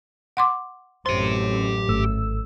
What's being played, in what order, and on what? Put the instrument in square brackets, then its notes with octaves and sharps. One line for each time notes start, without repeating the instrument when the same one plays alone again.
[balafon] F#5 C6 D6
[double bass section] A1 F#2 A2 [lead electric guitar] G4 C6 [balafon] C5
[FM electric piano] G#1 A3 E6